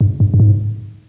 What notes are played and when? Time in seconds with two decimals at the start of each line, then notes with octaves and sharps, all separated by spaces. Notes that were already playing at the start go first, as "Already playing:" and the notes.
0.01 G2
0.20 G2
0.34 G2
0.40 G#2